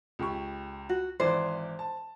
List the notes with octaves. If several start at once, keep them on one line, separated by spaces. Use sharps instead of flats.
C#2 G4 C#6
F#4
G#1 E3 C5 D5
A5